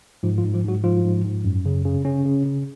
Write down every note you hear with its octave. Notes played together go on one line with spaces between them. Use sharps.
G#2 F3 F4
F3 F4
G#2
F3 F4
G#2 F#3 F#4
G#2 F3 F4
G#2
G#2
F#2
C#3
C#3
C#3 C#4
C#3
C#3